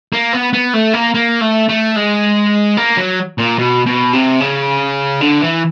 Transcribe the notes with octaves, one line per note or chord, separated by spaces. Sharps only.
A#3
B3
B3
A3
A#3
A#3
A3
A3
G#3
A#3
F#3
A#2
B2
B2
C3
C#3
D3
E3